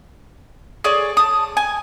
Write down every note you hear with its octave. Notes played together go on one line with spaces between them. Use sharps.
G#4 C#5 D5
A5 D#6
G#5